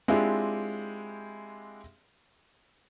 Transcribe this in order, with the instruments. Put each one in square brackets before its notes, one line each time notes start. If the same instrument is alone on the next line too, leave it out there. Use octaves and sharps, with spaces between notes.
[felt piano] G#3 C4 D4 E4 F4 G4